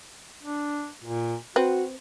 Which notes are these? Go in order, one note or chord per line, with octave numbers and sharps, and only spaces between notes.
D4
A#2
C4 F#4 B4